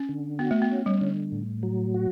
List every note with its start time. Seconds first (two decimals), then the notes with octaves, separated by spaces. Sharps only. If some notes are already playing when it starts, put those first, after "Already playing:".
Already playing: C#4
0.09 D3
0.39 B3 F#4
0.51 A3
0.62 B3
0.71 C#4
0.86 G3
1.01 D3
1.32 A2
1.63 F#3
1.94 F#4